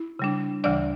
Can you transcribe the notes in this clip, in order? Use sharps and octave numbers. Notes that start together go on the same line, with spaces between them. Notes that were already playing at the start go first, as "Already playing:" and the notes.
Already playing: E4
C#3 G3 D4
D2 C#3 E3 G3 D4 D5